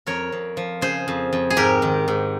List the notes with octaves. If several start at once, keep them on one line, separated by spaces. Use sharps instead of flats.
F2 A#4 C#5
F2
F3
C#3 G#4 C5
F2
F2
G#4
G#2 G4 A#4
D#3
G#2